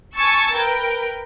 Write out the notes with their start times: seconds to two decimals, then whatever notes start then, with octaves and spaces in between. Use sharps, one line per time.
0.16 G#5 A5 C#6 E6 G#6 A6
0.56 A#4 B4 G5